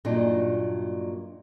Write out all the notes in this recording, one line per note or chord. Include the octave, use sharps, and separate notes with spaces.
G2 A#2 F#3 D4 D#4